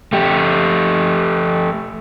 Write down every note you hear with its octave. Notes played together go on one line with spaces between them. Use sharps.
A3 G4